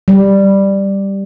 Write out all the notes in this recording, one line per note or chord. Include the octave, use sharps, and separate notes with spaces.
G3